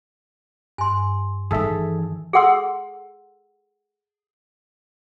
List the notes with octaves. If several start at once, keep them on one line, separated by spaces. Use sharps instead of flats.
G2 G#5 C6
D#3 E3 G#4 A4 E5
G#4 A4 F#5 C6 E6